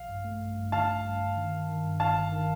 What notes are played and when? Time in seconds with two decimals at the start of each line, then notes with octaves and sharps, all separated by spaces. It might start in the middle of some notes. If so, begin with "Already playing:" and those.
Already playing: A#1 F5
0.09 G2
0.24 A3
0.40 G2
0.57 G2
0.72 D3 F5 A5
0.89 D3
1.05 G2
1.20 G2
1.36 D#3
1.52 D#3
1.69 D#3
1.84 G2
1.99 G1 F5 A5
2.16 G1
2.32 D#3